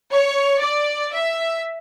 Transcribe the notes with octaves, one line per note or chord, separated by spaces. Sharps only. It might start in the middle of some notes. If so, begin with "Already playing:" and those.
C#5
D5
E5